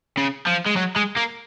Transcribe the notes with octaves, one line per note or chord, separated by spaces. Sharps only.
C#3
F3
G#3
F#3
G#3
A#3